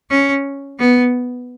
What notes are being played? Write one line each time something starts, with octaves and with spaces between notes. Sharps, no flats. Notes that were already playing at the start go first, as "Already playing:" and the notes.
C#4
B3